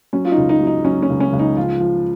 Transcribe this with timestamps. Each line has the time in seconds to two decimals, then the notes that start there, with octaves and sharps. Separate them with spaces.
0.13 F#3 C#4
0.25 F4
0.32 D#4
0.38 C#2
0.49 D#4
0.61 F#3
0.67 D#4
0.84 F#3 C#4
1.02 C#4
1.10 C#2
1.20 C#4
1.33 C#2
1.39 D#4
1.57 F3 F4
1.80 F3